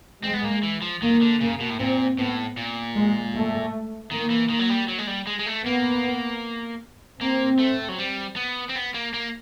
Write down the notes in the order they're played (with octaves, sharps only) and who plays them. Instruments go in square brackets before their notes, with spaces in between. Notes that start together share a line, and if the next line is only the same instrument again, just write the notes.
[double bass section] G#3 [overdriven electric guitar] C4
[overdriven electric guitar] B3
A#3
E3
F3
[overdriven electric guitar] D#3 [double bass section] A#3
[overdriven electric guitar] D3
[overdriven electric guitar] C#3 [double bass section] A#3
[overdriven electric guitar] B2
A2
[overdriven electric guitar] A#2 [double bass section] C4
[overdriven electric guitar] A2 [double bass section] B3
[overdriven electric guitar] A#2
[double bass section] G#3
A3
[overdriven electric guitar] D#3 [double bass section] A#3
[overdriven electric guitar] E3
D#3
F#3
G3
F#3
G#3
G3
G#3
G#3
A3
[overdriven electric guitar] A#3 [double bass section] B3
[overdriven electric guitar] A#3 [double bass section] C4
[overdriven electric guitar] A3
F#3
G3
B3
C4
B3
A#3
A#3